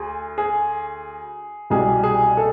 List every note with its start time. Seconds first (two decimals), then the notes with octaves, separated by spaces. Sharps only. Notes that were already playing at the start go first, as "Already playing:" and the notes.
Already playing: D2 G#4
0.38 G#4
1.70 C2 B2 G3 G#4
2.04 G#4
2.37 A4